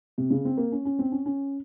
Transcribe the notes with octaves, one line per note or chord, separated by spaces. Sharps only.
C3
C#3
C4
A#3
C#4
C#4
C4
C#4
C#4